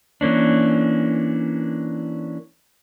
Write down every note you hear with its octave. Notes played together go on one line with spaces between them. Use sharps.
E3 A#3 C#4 D4